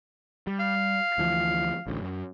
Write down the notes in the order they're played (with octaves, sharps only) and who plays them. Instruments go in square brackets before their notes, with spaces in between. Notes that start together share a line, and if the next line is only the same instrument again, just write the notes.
[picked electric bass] G3
[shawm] F5
[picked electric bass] D2 E3 F3
A1 D2
F#2